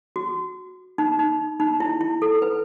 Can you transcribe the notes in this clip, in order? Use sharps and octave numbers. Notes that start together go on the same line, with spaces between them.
F#4
D#4
D#4
D#4
E4
E4
A4
B4